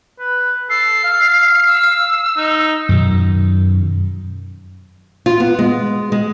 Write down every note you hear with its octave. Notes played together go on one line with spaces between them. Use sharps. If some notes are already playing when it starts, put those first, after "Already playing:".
B4
A4 C7
F5
E6
D#4
F#2 B2 D#3
F4
B3
G#3
G#3